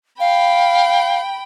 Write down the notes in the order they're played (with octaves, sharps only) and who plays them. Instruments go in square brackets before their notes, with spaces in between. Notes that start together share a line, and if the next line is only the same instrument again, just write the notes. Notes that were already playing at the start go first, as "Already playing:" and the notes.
[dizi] F5 [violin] G5 B5